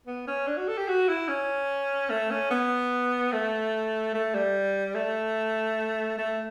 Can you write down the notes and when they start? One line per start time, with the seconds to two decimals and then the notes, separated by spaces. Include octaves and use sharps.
0.07 B3
0.28 C#4
0.47 D4
0.58 F#4
0.68 A4
0.78 G4
0.89 F#4
1.09 E4
1.29 C#4
2.10 A3
2.31 C#4
2.51 B3
3.33 A3
4.14 A3
4.35 G3
4.95 A3
6.19 A3